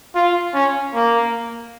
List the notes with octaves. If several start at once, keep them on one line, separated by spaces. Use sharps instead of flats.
F4
C#4
A#3